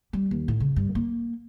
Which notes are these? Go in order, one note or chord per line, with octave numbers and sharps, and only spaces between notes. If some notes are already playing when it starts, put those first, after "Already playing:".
G3
D#2
A2
C#3
G2
A#3